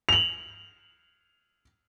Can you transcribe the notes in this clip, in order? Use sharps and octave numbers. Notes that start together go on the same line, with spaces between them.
F7 F#7